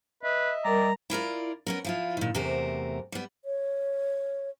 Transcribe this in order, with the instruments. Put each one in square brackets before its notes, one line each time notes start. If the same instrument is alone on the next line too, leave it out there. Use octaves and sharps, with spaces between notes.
[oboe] B4 [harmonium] D#5 E5
[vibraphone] G3 A#4 [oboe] D5 [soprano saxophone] A#5
[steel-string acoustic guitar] E4 F4 A#4 D5
B3 C#4 A#4
F3 E4 F4
A#2 D#3
E2 C3 A3 F#4 A#4 C5
G3 B3
[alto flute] C#5